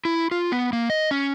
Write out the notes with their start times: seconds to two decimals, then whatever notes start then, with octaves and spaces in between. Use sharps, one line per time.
0.05 E4
0.31 F4
0.52 B3
0.73 A#3
0.90 D#5
1.11 C#4